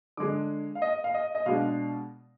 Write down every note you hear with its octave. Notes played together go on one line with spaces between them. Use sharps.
D3 G#3 D4 D6
F5
D#5
F5
D#5
D#5
B2 G#3 D4 F5